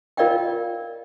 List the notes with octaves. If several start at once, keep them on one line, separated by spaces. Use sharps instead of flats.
F4 A#4 D5 D#5 F5 G5